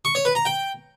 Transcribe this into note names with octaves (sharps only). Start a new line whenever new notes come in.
C#6
C#5
B4
A#5
G5